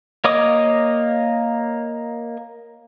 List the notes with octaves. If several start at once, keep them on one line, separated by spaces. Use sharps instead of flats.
A#3 C#5 D#5 D6 D#6